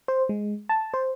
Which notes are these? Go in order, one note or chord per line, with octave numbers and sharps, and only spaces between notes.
C5
G#3
A5
C5